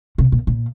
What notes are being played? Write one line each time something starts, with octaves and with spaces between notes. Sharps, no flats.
C3
A#2
A#2